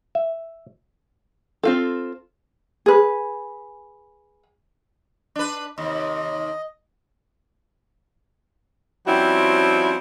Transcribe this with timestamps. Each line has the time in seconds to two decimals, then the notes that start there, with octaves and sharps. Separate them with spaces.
0.15 E5
1.63 C4 F4 A4
2.86 G#4 B4
5.36 D4 B4
5.78 D#2 C3 D#5
9.07 F3 G3 C4 C#4 E4 F#4